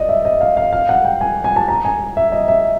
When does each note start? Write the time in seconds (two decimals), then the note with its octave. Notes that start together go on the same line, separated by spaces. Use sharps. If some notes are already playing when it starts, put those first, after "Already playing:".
Already playing: D5 D#5
0.09 E5
0.25 D#5
0.41 F5
0.57 F5
0.73 F5
0.89 F#5
1.05 G5
1.21 G#5
1.44 G#5
1.56 A5
1.68 A#5
1.85 G#5
2.17 E5
2.32 D#5
2.48 E5